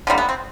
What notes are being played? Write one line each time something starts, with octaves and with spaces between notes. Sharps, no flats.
D3 G3 A#3 C4
B3
C4